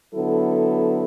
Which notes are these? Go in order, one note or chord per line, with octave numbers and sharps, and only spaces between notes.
D3 F#3 B3 E4 A4